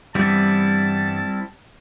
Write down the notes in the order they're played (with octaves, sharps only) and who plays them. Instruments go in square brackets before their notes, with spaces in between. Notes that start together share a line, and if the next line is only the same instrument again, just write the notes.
[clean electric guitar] G2 E3 B3 [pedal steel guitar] G3 C4 E4 [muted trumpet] A5